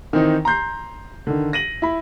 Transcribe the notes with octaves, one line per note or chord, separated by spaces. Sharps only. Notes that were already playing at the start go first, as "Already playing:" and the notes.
D#3 E3 C4 D#4
A#5 C6 G6 C7
D3 D#3
A#6 D#7 F#7
E4 B5